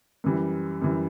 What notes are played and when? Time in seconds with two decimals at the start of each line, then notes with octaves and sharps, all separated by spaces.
0.24 F#2 E3 G3
0.82 F#2 E3 G3